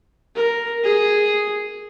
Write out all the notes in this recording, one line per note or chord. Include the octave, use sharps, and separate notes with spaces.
A#4
G#4